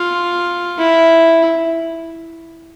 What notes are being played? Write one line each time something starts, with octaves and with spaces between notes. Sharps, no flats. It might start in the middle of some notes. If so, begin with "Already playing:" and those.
Already playing: F4
E4